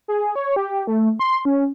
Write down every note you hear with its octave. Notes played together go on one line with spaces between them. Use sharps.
G#4
C#5
G4
A3
C6
C#4